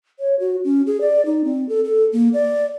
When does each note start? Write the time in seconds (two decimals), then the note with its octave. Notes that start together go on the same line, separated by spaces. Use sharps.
0.20 C#5
0.40 F#4
0.64 C#4
0.87 G#4
1.01 D5
1.26 D#4
1.44 C4
1.69 A4
1.85 A4
2.13 A#3
2.34 D5